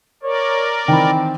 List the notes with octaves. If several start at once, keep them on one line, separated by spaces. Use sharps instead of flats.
A#4 C#5 D5
D#3 E3 C4 G5 B5